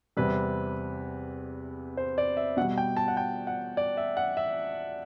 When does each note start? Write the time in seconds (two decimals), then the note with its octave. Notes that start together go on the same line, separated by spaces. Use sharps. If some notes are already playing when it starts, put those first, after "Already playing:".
0.17 E2 C3 G3 B4
1.97 C5
2.18 D5
2.37 E5
2.57 B2 F#5
2.61 G3
2.78 G5
2.97 A5
3.08 F#5
3.17 G5
3.47 F#5
3.77 D5
3.97 E5
4.17 F#5
4.37 E5